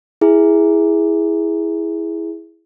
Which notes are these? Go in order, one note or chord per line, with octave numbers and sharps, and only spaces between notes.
E4 G#4